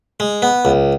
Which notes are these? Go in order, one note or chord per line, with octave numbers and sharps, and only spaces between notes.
G#3
B3
C#2